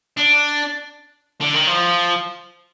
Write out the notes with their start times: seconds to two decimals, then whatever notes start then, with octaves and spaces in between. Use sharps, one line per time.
0.17 D4
1.41 D3
1.54 D#3
1.67 F3